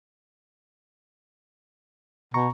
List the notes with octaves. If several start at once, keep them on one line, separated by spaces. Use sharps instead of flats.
B2 A#5 C#6